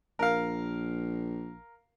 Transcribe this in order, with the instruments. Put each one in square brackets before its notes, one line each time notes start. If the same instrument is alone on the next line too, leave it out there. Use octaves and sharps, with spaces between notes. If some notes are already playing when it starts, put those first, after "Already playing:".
[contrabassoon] A#1 [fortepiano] A#4 F5